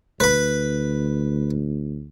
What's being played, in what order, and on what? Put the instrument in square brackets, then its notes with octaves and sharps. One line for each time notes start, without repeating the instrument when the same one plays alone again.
[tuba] D2 [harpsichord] B4 B5